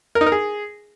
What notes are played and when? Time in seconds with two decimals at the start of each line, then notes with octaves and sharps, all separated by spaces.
0.15 A#4
0.21 D#4
0.26 A#4
0.32 G#4